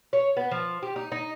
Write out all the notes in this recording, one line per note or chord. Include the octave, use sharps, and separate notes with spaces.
C#5
B3
F3
G4
D#4
D#4